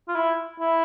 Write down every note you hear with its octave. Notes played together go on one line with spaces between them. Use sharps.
F4
E4
E4